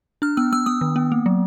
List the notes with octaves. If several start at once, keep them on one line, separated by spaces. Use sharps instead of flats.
D4 F6
B3 E6
B3 E6
B3 D#6
D#3
B3
A#3
F#3